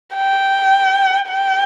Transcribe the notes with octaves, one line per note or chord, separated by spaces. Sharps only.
G5
G5